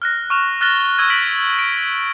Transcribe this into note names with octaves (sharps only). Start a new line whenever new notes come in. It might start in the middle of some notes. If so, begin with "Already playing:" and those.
F6 F#6 A#6
C#6 F6 E7 F7
F6 F#6 A6 A#6 G7
C#6 E6 G#6 D#7
F#6 B6 D7 F#7
D7